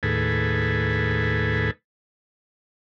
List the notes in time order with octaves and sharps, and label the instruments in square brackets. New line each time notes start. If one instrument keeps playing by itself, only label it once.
[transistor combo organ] D#2 A2 G#4 A4 B4